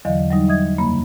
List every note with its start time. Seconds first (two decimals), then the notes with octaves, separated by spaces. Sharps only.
0.05 E2 D3 E3 F#3 D#5 F5
0.31 F#3 G3 D#4
0.48 D#5 E5 D#6 G#6
0.78 F#2 C#3 A#3 B5